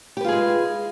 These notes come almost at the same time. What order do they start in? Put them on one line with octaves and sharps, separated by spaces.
G4 B4 F4 G#4 G#3